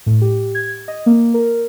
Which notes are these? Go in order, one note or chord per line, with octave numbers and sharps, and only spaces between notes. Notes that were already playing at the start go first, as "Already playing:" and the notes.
A2
G4
G#6
D#5
A#3
A#4